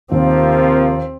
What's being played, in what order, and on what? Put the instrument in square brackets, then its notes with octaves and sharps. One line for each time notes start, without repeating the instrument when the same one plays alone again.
[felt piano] D#2 [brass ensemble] C3 F3 A#3 [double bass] C4